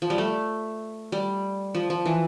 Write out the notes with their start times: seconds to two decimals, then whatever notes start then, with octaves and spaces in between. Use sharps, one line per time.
0.02 F3
0.10 G3
0.18 A3
1.12 G3
1.75 F3
1.90 F3
2.06 E3